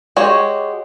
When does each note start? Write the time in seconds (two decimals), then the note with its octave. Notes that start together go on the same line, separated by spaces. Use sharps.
0.16 G#3 F#4 G4 C#5